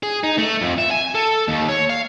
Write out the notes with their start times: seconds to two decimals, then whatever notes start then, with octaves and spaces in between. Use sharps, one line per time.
0.03 G#4
0.24 D#4
0.38 A3
0.62 F2
0.78 E5
0.91 G#5
1.15 A4
1.48 D#2
1.69 C#5
1.89 F5